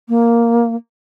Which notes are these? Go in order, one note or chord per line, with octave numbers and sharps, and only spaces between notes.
A#3